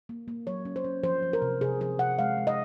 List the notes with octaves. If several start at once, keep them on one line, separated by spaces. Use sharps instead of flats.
A#3
A#3
F#3 C#5
C#4
C5
C#4
F3 C5
F3
A#4
C3
C3 G#4
F3 G#4
C3 F#5
G#3 F5
G#3
D#5